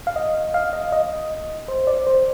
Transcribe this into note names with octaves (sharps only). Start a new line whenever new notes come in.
F5
D#5
F5
D#5
D#5
C5
D5
C5